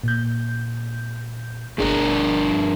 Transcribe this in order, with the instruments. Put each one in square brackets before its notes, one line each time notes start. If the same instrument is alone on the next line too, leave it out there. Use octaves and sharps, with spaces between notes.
[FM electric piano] A#2 G6
[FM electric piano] G1 G#4 [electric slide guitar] G2 D4 A#4